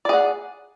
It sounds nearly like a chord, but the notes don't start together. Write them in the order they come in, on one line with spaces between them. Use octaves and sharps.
D5 G#4 F#5